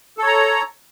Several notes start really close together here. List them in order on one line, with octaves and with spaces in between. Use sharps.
A4 C#5 A#5